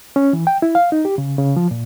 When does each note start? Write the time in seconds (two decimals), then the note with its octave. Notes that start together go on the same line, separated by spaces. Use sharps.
0.16 C#4
0.33 E3
0.47 G5
0.62 E4
0.75 F5
0.92 D#4
1.05 G4
1.18 C#3
1.38 C#3
1.57 F3
1.71 A#2